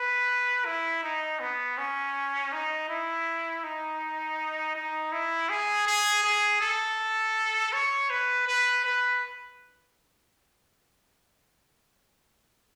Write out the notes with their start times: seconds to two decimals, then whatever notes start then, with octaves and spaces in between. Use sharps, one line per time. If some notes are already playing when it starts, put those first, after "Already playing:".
Already playing: B4
0.66 E4
1.03 D#4
1.40 B3
1.78 C#4
2.52 D#4
2.89 E4
3.64 D#4
4.75 D#4
5.12 E4
5.49 G#4
5.87 G#4
6.24 G#4
6.61 A4
7.73 C#5
8.10 B4
8.47 B4
8.85 B4